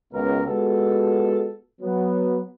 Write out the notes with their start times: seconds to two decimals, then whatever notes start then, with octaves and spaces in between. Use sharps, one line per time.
0.13 C#2 B2 A#4
0.47 G#3 B3 F4 F#4 A4
1.81 F#3 B3